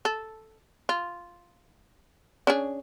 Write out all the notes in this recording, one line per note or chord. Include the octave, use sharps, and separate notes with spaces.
A4
F4
C#4 D4 G#4